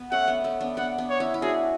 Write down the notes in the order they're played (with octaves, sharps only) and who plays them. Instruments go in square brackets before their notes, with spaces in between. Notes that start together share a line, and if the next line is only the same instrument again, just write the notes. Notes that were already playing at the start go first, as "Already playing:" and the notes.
Already playing: [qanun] B3
[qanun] A3 C#4 [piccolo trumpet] F#5
[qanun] B3 D4
A3 C#4
B3 D4
[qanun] B3 D4 [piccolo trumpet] F#5
[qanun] B3 D4
[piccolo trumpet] C#5
[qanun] C#4 E4
E4
[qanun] D4 F#4 [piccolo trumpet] G#4